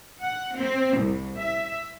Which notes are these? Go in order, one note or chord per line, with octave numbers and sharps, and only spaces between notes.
F#5
C4
C2
E5